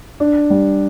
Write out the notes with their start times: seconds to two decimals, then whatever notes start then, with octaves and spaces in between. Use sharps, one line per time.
0.20 D4
0.50 G3